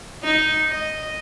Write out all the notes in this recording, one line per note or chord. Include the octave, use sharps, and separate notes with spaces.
D#4
D#5